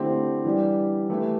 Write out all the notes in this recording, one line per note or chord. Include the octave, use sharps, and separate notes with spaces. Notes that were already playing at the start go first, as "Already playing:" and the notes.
Already playing: D3 A3 C4 E4 G4
E3 G3 D4 G4
E3 A3 E4 G4 B4